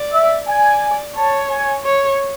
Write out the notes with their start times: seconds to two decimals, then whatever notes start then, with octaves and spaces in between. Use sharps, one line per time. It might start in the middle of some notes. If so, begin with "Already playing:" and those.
Already playing: D5
0.13 E5
0.47 D5 G#5
1.16 C#5 A5
1.50 G#5
1.85 C#5